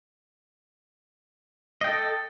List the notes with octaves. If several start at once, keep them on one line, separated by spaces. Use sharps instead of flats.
A4 D#5 G5